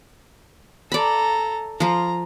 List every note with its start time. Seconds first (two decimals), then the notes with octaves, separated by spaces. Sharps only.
0.92 A4 D5 A#5 B5
1.80 F3 F4 A#5